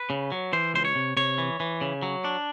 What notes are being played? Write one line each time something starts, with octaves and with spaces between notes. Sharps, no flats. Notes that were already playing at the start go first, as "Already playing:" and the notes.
Already playing: B4
C#3
F#3
E3 C5
C#2 C5
C#5
C3
C3 C#5
E3
E3
C#3
F#3
D4